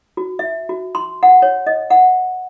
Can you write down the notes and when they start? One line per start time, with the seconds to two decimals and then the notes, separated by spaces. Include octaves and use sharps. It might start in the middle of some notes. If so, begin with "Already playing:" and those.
0.17 F#4
0.39 E5
0.69 F#4
0.95 C6
1.23 F#5
1.42 C#5
1.67 D#5
1.90 F#5